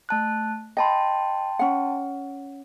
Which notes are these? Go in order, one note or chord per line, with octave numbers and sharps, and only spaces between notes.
A3 A5 F#6
D#5 G5 A5 B5 C6
C#4 F#5